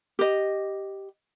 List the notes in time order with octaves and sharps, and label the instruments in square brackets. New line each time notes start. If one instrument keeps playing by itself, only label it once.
[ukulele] G4 D#5